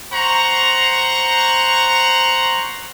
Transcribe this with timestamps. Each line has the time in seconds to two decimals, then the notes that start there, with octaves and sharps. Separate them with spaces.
0.13 C5 F#5 A#5 C6 C#6